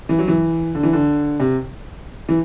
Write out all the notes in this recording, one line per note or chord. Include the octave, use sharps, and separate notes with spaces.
E3
F#3
E3
D3
E3
D3
C3
E3